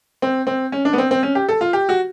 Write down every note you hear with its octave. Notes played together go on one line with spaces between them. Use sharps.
C4
C4
C#4
D4
B3
C4
C4
C#4
G4
A4
F4
G4
F#4